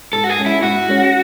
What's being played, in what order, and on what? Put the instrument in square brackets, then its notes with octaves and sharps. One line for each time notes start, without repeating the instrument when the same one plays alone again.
[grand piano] G#2 [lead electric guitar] A4
[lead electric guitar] F#4
G#4
[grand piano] G#3 C#4
[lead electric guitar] E4
[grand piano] G#2 [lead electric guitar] F#4
[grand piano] G#3 C#4